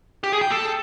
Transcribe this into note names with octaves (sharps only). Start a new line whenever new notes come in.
G4
G#4
G5
A4